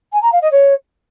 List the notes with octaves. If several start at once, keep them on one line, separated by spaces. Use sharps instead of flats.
G#5
A#5
F5
D#5
C#5